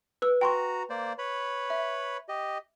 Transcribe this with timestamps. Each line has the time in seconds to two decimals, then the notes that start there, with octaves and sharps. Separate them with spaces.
0.22 B4 E6
0.41 F#4 G5 A#5 C6 C#6
0.90 A#3 C5 D5
1.18 B4 C#5 B5
1.70 E5
2.29 G4 D#5